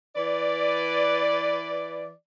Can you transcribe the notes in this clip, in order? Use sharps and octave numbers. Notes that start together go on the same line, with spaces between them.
E3 B4 D5